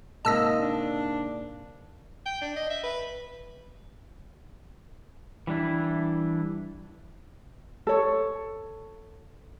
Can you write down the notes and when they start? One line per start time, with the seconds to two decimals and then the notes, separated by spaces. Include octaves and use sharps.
0.25 G#2 C3 A#3 D#5 A5 E6 A#6
0.59 D4
2.26 G5
2.41 D4
2.56 D#5
2.70 E5
2.83 B4
5.47 E3 G3 D4 E4
7.87 A4 C#5